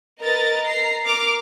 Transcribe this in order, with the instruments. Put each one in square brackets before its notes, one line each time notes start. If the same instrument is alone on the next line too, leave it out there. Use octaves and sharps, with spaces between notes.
[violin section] A#4 B4 D#5 A#5 A6
A#5 C7
A#4 D6 F6